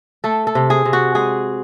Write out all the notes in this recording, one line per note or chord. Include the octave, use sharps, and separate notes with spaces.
A3 A4
A4
C3
G#4
C3
F#4
G#3 G#4